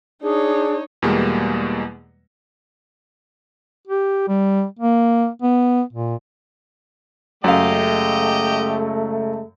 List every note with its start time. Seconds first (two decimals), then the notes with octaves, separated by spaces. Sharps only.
0.23 D4 D#4 G#4 C#5
1.02 E2 B2 G3 G#3 A#3
3.87 G4
4.28 G3
4.79 A#3
5.42 B3
5.93 A#2
7.44 F#2 C#3 G#3 A3 G4 D#5 F5